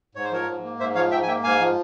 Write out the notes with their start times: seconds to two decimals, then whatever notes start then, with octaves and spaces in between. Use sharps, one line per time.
0.15 G#2 C#5
0.24 C5
0.32 F3 A#4 C#5
0.48 G#2
0.63 A#3
0.80 G#2 C5 E5
0.95 F3 C#5 F5
1.11 G#2 E5 G5
1.23 G#5
1.27 A#3 E5 G5
1.44 G#2 F5 G#5
1.60 F3